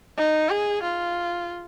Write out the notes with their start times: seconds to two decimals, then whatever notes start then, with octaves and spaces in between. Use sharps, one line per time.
0.17 D#4
0.50 G#4
0.83 F4